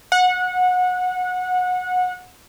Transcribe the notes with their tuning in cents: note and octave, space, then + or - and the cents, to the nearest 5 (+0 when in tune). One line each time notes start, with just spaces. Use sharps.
F#5 -25